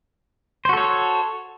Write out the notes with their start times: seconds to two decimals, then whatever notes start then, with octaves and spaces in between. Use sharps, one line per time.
0.65 C5
0.69 F#4
0.73 A4
0.77 C#5